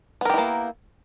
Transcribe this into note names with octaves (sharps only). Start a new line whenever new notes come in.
A#3 B3 E4 G4 A#4